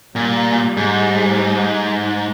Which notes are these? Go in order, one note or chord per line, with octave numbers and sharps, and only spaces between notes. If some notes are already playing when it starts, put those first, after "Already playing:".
A#2 G3
G#2